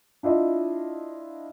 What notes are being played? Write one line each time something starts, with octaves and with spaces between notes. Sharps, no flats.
D4 E4 F4 D#5